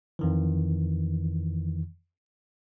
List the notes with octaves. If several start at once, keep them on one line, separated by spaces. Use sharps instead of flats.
F2 D#3 E3